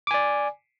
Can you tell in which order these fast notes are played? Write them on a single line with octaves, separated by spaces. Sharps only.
D6 G#5 D5